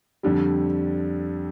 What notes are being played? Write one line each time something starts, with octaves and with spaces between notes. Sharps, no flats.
F2 D3 G3